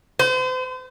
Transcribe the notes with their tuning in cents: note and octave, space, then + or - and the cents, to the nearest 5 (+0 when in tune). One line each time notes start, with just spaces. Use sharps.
C5 -40